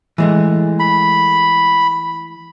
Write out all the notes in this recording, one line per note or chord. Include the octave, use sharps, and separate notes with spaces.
E3 G#3 A3
B5